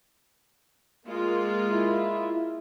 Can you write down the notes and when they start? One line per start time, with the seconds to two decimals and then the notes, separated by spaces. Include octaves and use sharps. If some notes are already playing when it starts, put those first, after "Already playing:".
1.07 G#3 A#3 F4
1.72 E4